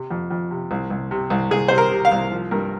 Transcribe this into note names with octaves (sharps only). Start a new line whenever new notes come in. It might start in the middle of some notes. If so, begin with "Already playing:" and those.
Already playing: C3
F2
F2
C3
C2
C2
C3
C2
C2 G#4
C3 C5
A#4
C3
F5
C2
F3
G2 A#4